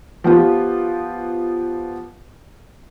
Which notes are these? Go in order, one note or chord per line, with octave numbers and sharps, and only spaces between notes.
F3 B3 F4 G4